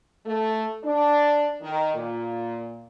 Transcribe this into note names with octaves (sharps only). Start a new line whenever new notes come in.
A3
D4
D#3
A#2